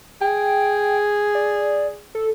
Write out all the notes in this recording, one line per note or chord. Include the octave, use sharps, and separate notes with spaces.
G#4 G5
D5
A4